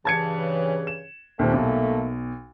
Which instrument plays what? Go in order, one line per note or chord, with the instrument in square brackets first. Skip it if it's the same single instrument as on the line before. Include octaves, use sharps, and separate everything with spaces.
[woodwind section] G2 C#3 E3 [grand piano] A5 G#6 C#7
[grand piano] E7
[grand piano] D#2 A#2 C4 [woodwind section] A3 A#3
[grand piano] B1